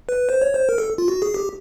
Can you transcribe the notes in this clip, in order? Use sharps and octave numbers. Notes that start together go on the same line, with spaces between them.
B4
C5
C#5
C5
A#4
A4
F4
F#4
G#4
G4